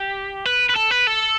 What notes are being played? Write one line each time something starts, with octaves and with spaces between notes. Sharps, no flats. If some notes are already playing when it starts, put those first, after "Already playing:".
Already playing: G4
B4
B4
A4
B4
A4